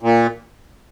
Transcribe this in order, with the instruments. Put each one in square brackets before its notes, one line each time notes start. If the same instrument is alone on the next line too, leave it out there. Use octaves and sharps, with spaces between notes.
[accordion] A#2